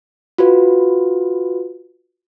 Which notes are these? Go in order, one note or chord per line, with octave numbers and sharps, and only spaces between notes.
F4 F#4 B4